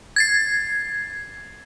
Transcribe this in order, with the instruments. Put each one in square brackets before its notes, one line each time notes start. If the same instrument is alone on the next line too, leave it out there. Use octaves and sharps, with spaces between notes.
[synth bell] G#6 A6 C7